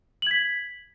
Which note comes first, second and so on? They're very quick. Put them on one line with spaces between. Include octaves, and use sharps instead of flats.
F#7 G#6 B6